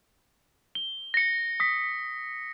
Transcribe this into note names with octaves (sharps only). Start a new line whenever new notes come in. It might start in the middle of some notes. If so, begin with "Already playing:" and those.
G7
A#6 C#7
D#6 B6